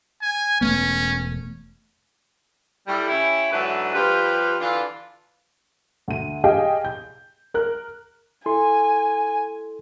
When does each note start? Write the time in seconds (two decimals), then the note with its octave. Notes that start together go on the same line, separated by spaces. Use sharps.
0.22 G#5
0.61 E1 A3 B3 C#4
2.87 A2 G3
3.09 C#4 E4 G4
3.52 G#2 D3 E3 F#3 D4 B4
3.94 F3 G3 F4 G4 B4
4.60 D3 E3 D4 F4
6.08 D2 D#7
6.44 G4 G#4 D#5 F5 G5 G#5
6.85 G6
7.54 A#4 F#6
8.46 E4 A4 G#5 C6